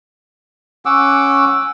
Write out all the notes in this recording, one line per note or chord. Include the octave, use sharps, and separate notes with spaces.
C#4 F#5 D6 E6